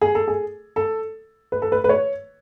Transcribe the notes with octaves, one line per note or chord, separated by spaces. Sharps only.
G#4
A4
G#4
A4
B4
A4
B4
B4
C#5